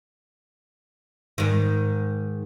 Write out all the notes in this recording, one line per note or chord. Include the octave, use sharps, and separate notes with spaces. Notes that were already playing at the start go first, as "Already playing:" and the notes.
G#2 D#3